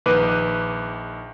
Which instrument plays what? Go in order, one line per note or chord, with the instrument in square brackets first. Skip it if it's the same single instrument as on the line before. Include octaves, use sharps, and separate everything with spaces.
[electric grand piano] A#1 D#3 B4 D6 F#6 D#7